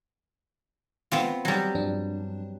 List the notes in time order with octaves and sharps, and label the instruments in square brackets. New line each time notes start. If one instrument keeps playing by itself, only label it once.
[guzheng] B3 C4 F4
F#3 G3
[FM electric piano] G2 F3 D4